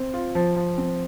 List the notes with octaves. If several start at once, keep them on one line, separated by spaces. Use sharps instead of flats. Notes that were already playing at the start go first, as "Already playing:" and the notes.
Already playing: C4
F4
F3
F3
C4